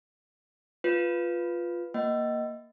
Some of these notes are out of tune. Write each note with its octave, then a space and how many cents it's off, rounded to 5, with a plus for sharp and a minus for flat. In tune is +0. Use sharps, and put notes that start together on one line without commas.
F4 +0 B4 +0
A#3 +0 D#5 +0 F#5 +40